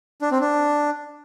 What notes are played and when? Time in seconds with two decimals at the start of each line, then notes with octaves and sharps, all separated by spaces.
0.22 D4
0.31 C4
0.41 D4